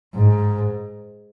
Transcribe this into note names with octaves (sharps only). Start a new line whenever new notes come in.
G#2